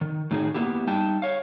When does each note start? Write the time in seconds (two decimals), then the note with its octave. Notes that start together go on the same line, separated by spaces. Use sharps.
0.01 D#3
0.31 A2 D#3 D#4 F#4 G#4
0.54 A#3 B3 E4 G4
0.87 G3 D#4 G5 A5
1.22 C#5 F5